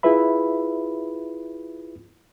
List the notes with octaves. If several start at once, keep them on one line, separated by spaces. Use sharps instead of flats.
E4 F4 G#4 B4 E5 B5